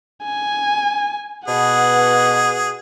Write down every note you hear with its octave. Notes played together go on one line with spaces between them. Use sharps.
G#5
B2 G#4 F#5